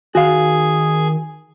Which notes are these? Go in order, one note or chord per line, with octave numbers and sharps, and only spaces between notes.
D#3 F#4 G#4 F5